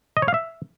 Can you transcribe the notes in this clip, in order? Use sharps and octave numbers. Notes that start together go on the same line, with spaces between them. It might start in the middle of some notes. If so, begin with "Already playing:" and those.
D#5
C#5
F5
E5